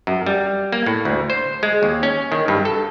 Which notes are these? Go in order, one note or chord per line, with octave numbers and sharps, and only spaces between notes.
F#2
G3
A#3
A2
D2
C5
G#3
D#2
C#4
D#3
G2
A4